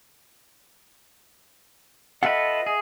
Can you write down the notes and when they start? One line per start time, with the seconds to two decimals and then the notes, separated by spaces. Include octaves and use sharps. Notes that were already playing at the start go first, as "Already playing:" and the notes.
2.23 F4 A4 B4 D#5 E5 F#5
2.66 G#4